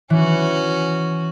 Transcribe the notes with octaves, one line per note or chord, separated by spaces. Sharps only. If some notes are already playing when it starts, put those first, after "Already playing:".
E3 C#4 F#4